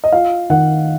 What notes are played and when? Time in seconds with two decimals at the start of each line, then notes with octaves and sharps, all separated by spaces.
0.04 D#5
0.12 F4 F5
0.50 D#3 F#5